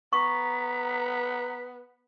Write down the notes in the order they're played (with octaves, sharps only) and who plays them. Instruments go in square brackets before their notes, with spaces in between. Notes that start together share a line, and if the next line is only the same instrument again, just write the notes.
[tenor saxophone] B3 [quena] A#5 [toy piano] C#6 [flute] B6